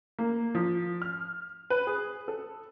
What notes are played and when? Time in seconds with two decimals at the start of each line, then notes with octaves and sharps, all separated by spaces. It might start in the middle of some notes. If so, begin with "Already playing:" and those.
0.19 A#3
0.55 F3
1.02 F6
1.70 B4
1.87 G#4
2.28 A4